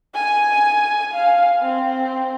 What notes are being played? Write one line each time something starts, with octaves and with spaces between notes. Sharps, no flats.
G#5
F5
C4